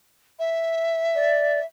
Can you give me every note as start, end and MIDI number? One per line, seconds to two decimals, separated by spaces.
0.39 1.65 76
1.15 1.60 74